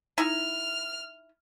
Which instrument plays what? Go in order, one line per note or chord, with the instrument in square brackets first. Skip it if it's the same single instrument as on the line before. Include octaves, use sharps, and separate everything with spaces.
[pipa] D#4 E4 [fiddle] F6